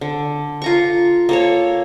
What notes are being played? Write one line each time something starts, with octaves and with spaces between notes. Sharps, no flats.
D3
F4 A#5 C#6
A#3 A4 C#5